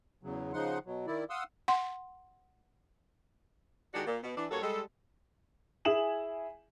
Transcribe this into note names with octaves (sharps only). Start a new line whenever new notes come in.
E2 C#3 F#3
C#3 F3 D#4 F#5 C6
B2 F#3
D#3 E4 D5
F5 F#5 C6 D#6 E6
F#5 C6
D#3 G#3 D4 F#4 G4 D5
A#2
B2
E3 D4
G2 A#3 F#4 A4 C#5
G3 G#3 A4
E4 G#4 G#5 E7 F#7